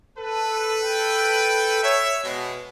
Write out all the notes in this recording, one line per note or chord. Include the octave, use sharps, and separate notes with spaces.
A4 B4
G5
C#5 E5
B2 G#3